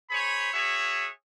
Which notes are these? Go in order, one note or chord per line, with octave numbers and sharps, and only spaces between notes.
G#4 C5 C#5 B5
F#4 G#4 C#5 E5